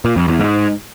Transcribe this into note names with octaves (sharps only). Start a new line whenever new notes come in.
A#2
F2
E2
G#2